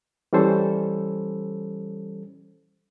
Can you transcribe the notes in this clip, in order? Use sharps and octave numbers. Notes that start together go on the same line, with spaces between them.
E3 G3 C#4 A4 C5